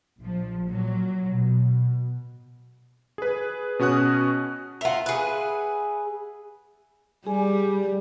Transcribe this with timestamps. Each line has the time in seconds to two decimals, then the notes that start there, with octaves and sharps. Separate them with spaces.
0.19 A#1 F3
0.66 A#2 F#3
1.31 B2
3.18 G#4 B4
3.79 B2 C#4 F#4 D#6 F#6
4.81 F4 A#4 E5 F#5
5.06 G#4 B4
7.27 G3 G#4 G#5